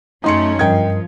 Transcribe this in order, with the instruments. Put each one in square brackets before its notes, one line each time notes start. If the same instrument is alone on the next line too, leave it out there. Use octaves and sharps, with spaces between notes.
[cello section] F#2 A3 C#4 [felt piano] D#4 C6 C#7
[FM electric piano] G2 A#4 D#5 [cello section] F3 [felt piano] G5 G#6